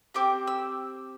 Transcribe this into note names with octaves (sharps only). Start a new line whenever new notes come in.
C4 G4 D6
E6